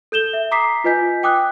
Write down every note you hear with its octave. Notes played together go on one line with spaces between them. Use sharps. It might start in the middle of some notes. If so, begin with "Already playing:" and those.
A4 G6 E7 G7
E5
A#5 D6 D#6 B6 C7
F4 B4 D#5 G#5 G6 B6
G5 D6 D#6 F#6